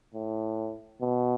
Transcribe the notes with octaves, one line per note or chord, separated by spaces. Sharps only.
A2
B2